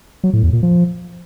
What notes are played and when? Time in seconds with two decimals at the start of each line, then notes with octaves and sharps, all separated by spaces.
0.24 F#3
0.33 A2
0.43 E2
0.53 A#2
0.63 F3